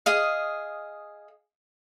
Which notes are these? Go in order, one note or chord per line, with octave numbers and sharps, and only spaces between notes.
G#4 D#5 F5